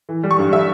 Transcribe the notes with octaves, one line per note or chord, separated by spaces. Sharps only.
E3
G3
C#6
G2
G3 E5